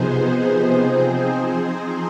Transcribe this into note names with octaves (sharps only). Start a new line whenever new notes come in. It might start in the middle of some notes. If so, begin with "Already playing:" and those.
Already playing: C3 F3 B3 D#4 G#4 C5
F3 C4 D#4 G#4 C5
G#4